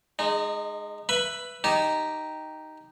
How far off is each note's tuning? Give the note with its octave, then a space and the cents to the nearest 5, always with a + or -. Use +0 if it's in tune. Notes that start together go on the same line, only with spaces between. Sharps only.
G#3 +0 D#4 -30
B4 +0 E5 +15 B5 +10
D#4 +0 G4 +0 G#5 +45